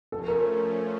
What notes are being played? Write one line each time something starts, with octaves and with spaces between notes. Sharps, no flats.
F3 A3 C#4 A4
A#4